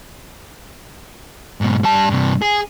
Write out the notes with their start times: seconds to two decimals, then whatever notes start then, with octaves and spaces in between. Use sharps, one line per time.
1.61 G#2 B2
1.83 G3 A5
2.09 G2 C3
2.42 G#4